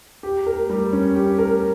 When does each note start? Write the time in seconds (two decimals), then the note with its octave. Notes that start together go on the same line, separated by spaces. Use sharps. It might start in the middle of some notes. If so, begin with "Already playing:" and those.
0.23 G4
0.47 A#4
0.70 G3
0.92 C#4
1.15 G4
1.39 A#4